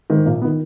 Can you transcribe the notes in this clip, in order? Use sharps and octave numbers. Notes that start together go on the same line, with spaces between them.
G#2 D#3
A#1 A#3
B3
D#3